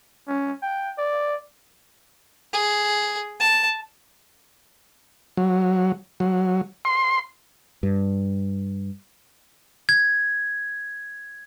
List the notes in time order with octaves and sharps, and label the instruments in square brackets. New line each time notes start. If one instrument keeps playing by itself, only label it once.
[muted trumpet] C#4
G5
D5
[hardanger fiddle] G#4
A5
[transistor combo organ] F#3
F#3
C6
[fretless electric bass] G2
[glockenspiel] G#6